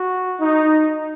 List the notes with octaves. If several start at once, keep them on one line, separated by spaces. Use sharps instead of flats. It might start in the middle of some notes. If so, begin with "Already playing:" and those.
Already playing: F#4
D#4